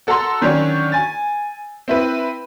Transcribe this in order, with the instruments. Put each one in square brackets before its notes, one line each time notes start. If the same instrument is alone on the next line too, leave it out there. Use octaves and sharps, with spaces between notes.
[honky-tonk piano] F#4 A4 F#5 A5 A#5 C6
D3 D#3 F#3 C#4 D4 C#5
G#5 A6
C4 E4 B4